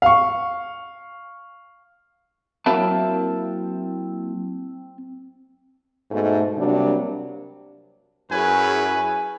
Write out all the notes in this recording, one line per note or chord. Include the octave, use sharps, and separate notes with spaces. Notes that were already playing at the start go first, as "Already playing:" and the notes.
F5 C#6
F#3 A#3 C4 E4 A5
G#2 B2 A3
C3 F#3 G3 A#3 D4
F#2 E4 G#4 B4 C#5 G#5